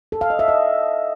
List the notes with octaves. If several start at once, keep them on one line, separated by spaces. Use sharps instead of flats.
A4
F5
D#5
E5
D#5